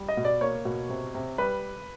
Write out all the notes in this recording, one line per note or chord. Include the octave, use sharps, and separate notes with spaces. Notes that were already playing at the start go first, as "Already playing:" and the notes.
Already playing: G3
D#5
B2
D5
A#3 C#5
B2
C3
C3
G3 B4